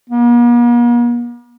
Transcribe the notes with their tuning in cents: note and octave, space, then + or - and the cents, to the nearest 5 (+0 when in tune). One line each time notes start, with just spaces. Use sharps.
A#3 +45